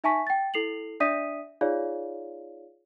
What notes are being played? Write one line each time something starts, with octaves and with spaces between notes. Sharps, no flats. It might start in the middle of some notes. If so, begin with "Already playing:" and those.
D#4 E5 G#5 A5 C#6 B6
G5 A6
E4 A4 C7 F7 F#7
D4 D5 E5 D#6 B6 D#7
D#4 F4 G#4 C#5 D5 F5